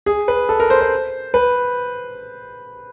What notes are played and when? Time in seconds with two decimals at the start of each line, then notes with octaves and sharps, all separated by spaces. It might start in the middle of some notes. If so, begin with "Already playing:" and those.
0.06 G#4
0.28 B4
0.49 A4
0.60 A#4
0.70 C5
0.81 C5
1.34 B4